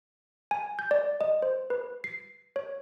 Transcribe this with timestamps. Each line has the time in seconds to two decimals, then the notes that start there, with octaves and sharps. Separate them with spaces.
0.51 G#5
0.79 G6
0.91 D5
1.21 D#5
1.42 C5
1.70 B4
2.04 C7
2.56 C#5